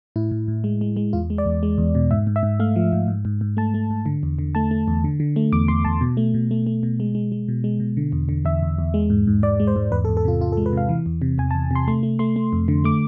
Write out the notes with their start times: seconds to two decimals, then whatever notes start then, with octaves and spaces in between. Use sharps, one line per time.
0.16 A2 E4
0.31 A2
0.48 A2
0.64 G#3
0.81 G#3
0.97 G#3
1.13 E2 F4
1.30 G#3
1.38 D5
1.46 E2
1.63 G#3
1.78 E2
1.95 B2
2.11 G#2 E5
2.27 G#2
2.36 E5
2.43 G#2
2.60 A3 F5
2.76 F3
2.93 G#2
3.08 G#2
3.25 G#2
3.41 G#2
3.57 A3 A5
3.74 A3
3.90 G#2
4.06 D3
4.23 E2
4.38 D3
4.55 A3 A5
4.71 A3
4.88 E2
5.04 D3
5.20 D3
5.36 A3
5.53 E2 D6
5.68 E2 C6
5.85 E2 A5
6.01 B2
6.17 A3
6.34 B2
6.51 A3
6.66 A3
6.83 B2
7.00 G#3
7.15 G#3
7.32 G#3
7.48 B2
7.64 G#3
7.80 B2
7.97 D3
8.12 E2
8.29 D3
8.45 E2 E5
8.62 E2
8.78 E2
8.94 G#3
9.10 G#2
9.27 G#2
9.43 G#2 D5
9.60 G#3
9.67 C5
9.76 G#2
9.92 E2 B4
10.05 A4
10.09 E2
10.17 A4
10.25 C3 F4
10.41 E2 F4
10.52 A4
10.57 G#3
10.66 B4
10.73 C3 F5
10.89 E3
11.06 E2
11.22 C3
11.38 E2 G#5
11.51 A5
11.55 E2
11.71 C3 C6
11.88 A3 C6
12.03 A3
12.19 A3 C6
12.36 A3
12.53 F2
12.68 D3
12.84 A3 D6